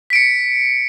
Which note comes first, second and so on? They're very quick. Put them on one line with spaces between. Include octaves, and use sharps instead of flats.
B6 D7 C#7